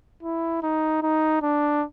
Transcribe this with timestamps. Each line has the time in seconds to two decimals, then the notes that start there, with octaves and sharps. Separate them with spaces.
0.23 E4
0.63 D#4
1.03 D#4
1.42 D4